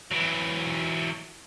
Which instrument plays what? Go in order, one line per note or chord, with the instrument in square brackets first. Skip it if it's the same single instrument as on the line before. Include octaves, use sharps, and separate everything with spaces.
[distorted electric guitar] E3 F#3